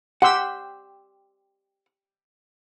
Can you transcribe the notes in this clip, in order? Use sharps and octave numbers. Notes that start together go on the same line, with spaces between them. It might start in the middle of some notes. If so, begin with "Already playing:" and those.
G4 F#5 C6 E6